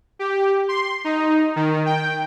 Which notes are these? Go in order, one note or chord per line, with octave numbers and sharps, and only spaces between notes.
G4
C6
D#4
D#3
G5